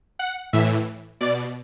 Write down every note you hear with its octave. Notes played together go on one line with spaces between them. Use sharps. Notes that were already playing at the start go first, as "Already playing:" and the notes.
F#5
A2 E3 E5
B2 D5